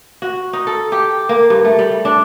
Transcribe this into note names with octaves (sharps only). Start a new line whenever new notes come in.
F#4
D#4
A4
G4
A#3
G2
A3
G3
D4